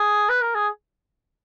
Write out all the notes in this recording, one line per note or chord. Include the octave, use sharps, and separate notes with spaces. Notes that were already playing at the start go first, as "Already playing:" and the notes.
Already playing: G#4
B4
A#4
G#4